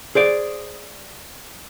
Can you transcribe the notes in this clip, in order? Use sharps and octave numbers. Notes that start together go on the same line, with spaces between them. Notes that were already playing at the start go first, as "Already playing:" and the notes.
G#4 C5 D5